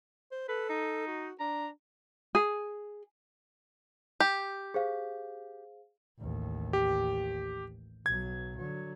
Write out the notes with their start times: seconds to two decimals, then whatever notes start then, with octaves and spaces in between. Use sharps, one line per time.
0.31 C5
0.49 A4 B4
0.69 D#4
1.07 F#4
1.40 D4 A#5
2.35 G#4
4.20 G4
4.74 G#4 C5 F5
6.19 A1 D#2
6.73 G4
8.06 B1 F#3 G#6
8.56 D3 F#3